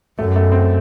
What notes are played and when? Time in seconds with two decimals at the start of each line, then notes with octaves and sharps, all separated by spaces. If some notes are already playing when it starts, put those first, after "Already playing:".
0.19 F#2 A3
0.36 A3
0.52 C4